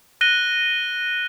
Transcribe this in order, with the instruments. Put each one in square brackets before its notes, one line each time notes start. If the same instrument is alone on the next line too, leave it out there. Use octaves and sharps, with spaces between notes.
[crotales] F#6 A#6 D#7 G7